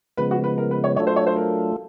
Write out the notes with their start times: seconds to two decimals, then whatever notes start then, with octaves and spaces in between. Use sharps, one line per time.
0.17 C#3 F3 G#3 B3 B4
0.31 F#4
0.44 B4
0.58 A#4
0.71 B4
0.84 C#5
0.96 F#3 A3 D4 F4 A4 C#5
1.07 C5
1.16 C#5
1.27 C5
1.36 A#4